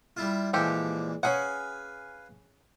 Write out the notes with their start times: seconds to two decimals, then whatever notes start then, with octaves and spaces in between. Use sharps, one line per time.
0.17 G3 E4 F4
0.53 A#2 E3 F3 G#3 G4 A4
1.23 C#4 G#4 B4 F5 F#5 G#5